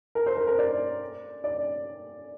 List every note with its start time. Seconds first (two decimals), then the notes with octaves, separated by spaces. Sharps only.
0.15 A#4
0.26 C5
0.37 A#4
0.47 A#4
0.58 D5
1.44 D5